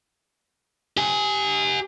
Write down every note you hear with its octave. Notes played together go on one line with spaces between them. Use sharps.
G4 G#5